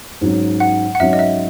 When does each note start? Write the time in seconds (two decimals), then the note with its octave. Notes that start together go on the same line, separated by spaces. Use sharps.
0.21 G#2 F#3 C#4
0.60 F#5
0.95 F#5
1.00 G#2 F#3 C#4 E5
1.13 D#5
1.19 E5